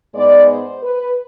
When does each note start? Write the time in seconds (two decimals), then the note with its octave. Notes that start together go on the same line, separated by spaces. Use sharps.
0.15 G#2 G#3 B3 D5
0.49 C5
0.83 B4